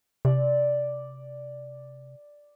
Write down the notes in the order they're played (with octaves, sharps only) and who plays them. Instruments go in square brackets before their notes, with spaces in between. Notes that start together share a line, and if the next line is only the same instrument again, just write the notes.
[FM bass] C3 [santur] D5